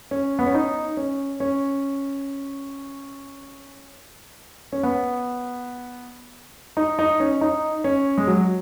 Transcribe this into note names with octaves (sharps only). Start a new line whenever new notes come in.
C#4
B3
C#4
D#4
C#4
C#4
C#4
B3
D#4
D#4
C#4
D#4
C#4
G#3
F#3